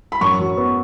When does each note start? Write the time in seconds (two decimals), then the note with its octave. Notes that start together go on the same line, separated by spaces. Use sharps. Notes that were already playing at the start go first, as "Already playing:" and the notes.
0.12 B5
0.21 F#2 C#6
0.39 F#3
0.57 B3